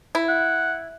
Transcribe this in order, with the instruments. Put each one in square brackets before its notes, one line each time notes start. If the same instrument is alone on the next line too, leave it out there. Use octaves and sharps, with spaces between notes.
[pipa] E4
[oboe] F#5